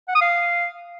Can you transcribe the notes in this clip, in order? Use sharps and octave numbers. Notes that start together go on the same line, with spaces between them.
F#5
D#6
F5